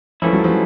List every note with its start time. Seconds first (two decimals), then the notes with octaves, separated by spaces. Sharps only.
0.22 G#2 E3 F3 A3 C#4 E4
0.33 F#3
0.44 F3 G3